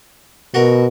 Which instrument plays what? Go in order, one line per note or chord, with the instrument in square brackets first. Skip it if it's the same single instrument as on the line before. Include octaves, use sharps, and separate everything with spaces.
[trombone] B2 [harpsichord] F#4 A#4